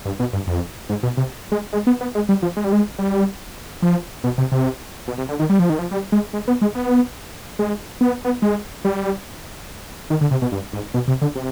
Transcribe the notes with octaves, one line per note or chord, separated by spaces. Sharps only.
G2
B2
G2
F2
G#2
B2
C3
G#3
G#3
B3
B3
G#3
G3
F3
G#3
G3
G#3
G3
F3
B2
C3
C3
B2
C3
D3
D#3
G3
F3
D#3
F3
G3
G#3
G#3
B3
G#3
B3
G#3
B3
B3
G#3
G3
D#3
D3
C3
B2
G2
G#2
B2
C3
D3
C3